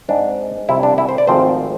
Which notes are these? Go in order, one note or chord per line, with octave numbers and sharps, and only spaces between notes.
G#2 G#3 C4 D4
C2 C3 F3 E4
D4
E4
C5
D5
G#1 G#2 F3 A3 C4 C5